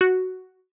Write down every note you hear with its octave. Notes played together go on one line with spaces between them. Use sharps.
F#4